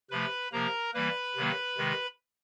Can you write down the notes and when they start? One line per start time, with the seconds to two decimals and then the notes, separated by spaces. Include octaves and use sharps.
0.10 C3 F3 A3 B4 B5
0.52 C3 F3 A#3 A#4 A#5
0.94 E3 G3 A#3 B4 B5
1.36 C3 D#3 F#3 A#3
1.78 C3 D#3 G#3